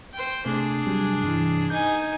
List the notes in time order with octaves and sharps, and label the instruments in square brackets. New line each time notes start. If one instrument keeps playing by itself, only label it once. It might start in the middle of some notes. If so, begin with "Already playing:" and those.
[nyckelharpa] C5 G5
[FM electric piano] C3 A3 [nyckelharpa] D4 G#4
[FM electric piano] C3 F#3 G3
G2 C3 E3
[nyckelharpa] D#4 G#5 [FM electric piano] G6